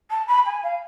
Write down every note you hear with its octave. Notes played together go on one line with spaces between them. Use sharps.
A5
B5
G#5
F5